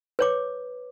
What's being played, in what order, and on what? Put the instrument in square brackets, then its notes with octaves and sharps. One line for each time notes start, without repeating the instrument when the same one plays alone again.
[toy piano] B4 C#5 D6